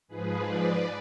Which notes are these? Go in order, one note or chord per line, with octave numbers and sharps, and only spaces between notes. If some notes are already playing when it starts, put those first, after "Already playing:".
G#2 F3 G#3 G#4 B4
B4 D5